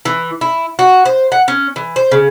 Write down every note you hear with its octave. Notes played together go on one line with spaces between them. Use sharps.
E3
E4
F#4
C5
F#5
C#4
E3
C5
C#3